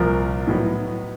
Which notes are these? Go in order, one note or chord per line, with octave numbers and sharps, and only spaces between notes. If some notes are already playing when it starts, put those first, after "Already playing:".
Already playing: C2 A#2 F3 A#4
A2 F#3 B3 D#4